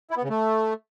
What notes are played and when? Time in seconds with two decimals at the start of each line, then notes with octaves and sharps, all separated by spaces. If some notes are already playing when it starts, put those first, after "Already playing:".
0.11 E4
0.17 B3
0.23 C#3
0.30 A3